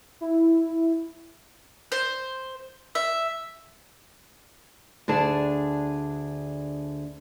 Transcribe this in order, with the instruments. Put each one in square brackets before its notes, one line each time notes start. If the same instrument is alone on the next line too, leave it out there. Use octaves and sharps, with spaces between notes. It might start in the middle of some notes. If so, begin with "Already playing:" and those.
[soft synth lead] E4
[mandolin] C5
E5
[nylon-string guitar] D2 D4 G#4 A5